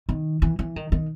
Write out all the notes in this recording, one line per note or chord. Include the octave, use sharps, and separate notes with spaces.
D#3
E3
E3
D#3
D#3